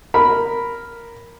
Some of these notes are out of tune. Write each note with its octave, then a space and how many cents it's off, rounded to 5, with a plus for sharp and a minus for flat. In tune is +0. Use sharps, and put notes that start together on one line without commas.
A#4 +0 B5 +0